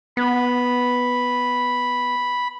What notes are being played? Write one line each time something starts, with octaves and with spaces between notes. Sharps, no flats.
B3 B5